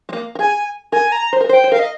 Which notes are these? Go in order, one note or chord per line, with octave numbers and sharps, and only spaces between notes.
G#3
A#3
A#4
G#4 G#5
A#4 G#5
A#5
C5
A#4
C5
G5
C5
A#4 F5
D#5